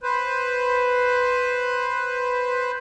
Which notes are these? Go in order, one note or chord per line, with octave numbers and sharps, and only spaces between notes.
B4 C5